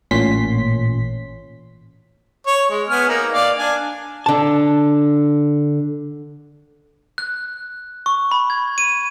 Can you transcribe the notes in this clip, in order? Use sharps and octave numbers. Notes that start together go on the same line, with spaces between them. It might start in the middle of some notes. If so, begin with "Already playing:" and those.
A1 A#2 C#4 C6 B6
C#5
G#3
B3 G#5 F6
A#3 D#4
D5 F5
D4 G#5
D3 A5
F#6
C#6
B5
G#6
D#7